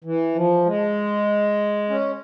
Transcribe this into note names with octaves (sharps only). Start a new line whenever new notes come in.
E3
F3
G#3
C#4